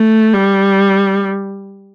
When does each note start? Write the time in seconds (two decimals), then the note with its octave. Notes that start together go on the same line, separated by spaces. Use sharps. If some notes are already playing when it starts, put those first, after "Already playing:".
Already playing: A3
0.33 G3